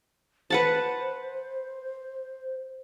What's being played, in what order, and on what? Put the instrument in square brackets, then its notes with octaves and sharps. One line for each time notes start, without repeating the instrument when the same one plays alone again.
[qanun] B4 F#5 A5 [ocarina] C5